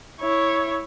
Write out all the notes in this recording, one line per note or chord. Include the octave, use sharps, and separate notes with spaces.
E4 C#5